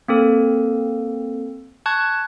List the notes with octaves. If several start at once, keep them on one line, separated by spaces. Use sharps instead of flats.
A#3 C4 A4
A5 C#6 F#6 G#6